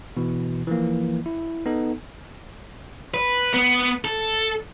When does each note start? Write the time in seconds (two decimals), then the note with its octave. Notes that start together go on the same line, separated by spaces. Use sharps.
0.17 B2 E3
0.67 E3 F3 A#3
1.26 E4
1.66 B3 D#4 A4
3.14 B4
3.54 B3
4.05 A4